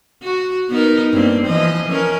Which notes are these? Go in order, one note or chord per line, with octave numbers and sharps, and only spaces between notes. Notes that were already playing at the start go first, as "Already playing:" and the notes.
F#4
B3 D#4 A#4
G2 A#3 C4
E3 F3 D#5
F3 C#4 A#4